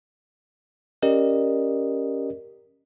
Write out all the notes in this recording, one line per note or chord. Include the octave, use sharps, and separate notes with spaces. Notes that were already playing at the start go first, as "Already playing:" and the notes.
C#4 G4 A#4 D5 D#5